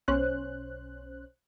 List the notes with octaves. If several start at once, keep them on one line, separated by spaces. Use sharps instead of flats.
B1 C#4 C5 F#6